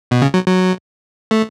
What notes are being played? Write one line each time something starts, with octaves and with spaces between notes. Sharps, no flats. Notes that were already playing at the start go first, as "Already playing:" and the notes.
B2
C#3
F#3
F#3
A3